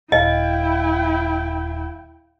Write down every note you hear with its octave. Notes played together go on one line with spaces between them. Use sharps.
D#1 E4 D#5 F5 G5